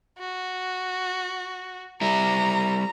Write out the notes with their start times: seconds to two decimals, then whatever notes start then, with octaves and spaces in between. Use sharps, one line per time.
0.19 F#4
2.01 G3 E4 A#5